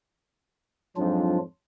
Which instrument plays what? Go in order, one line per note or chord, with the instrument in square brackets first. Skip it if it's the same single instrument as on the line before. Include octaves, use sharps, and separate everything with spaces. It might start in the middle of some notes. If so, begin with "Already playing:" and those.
[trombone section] F2 G#2 F3 [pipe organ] F#3 D4 F4